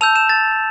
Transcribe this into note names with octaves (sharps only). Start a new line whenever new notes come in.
A5 E6 G6 F7
E7
A6